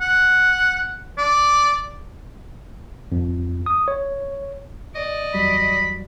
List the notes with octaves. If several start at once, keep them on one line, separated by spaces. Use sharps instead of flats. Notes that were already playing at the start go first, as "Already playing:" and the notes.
F#5
D5
F2
D#6
C#5
D5 D#5
E2 F#3 G3 B5